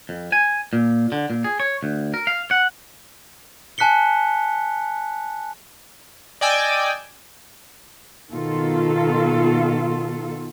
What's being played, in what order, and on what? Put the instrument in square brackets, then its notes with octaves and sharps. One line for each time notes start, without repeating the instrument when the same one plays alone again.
[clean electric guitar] F2
G#5
A#2
D3
A#2
G#4
C#5
D2
A#4
F5
F#5
[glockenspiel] G#5 A5 F#6 B6 C#7 G7
[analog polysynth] D5 D#5 G5 G#5 D6 E6
[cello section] B2 D#3 F4 A4